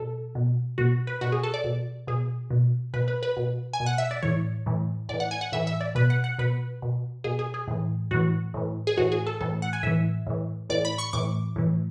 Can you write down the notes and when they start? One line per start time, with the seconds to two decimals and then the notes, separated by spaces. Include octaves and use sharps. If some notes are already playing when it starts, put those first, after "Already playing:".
Already playing: B2 A4
0.35 B2
0.78 B2 F#4
1.07 B4
1.21 B2 F#4
1.32 G#4
1.43 A4
1.54 D5
1.64 B2
2.07 B2 G#4
2.50 B2
2.94 B2 B4
3.08 B4
3.23 B4
3.37 B2
3.73 G#5
3.80 B2
3.86 F#5
3.98 E5
4.11 D5
4.23 A2 E3 C#5
4.66 A2 E3
5.09 A2 D5
5.14 E3
5.20 F#5
5.31 G#5
5.41 F#5
5.52 A2 E3 E5
5.67 E5
5.81 D5
5.95 B2 B4
6.10 F#5
6.24 F#5
6.39 B2 B4
6.82 B2
7.24 B2 G#4
7.39 G#4
7.54 G#4
7.68 A2 E3
8.11 A2 E3 F#4
8.54 A2 E3
8.87 G#4
8.97 A2 E3 F#4
9.12 G#4
9.27 A4
9.41 A2 E3 A4
9.62 F#5
9.73 G#5
9.83 A2 E3 E5
10.27 A2 E3
10.70 A2 E3 D5
10.85 B5
10.98 C#6
11.13 A2 E3 D6
11.56 A2 E3